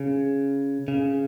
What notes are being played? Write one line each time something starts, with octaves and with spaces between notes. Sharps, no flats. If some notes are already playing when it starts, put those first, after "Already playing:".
Already playing: C#3
C#3